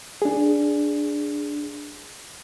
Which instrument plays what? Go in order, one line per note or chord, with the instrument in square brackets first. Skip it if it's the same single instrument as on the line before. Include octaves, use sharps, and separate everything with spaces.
[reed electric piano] D4 G#4